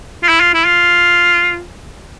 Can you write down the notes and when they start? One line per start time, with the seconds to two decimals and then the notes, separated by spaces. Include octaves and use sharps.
0.23 F4
0.29 E4
0.41 F4
0.54 E4
0.66 F4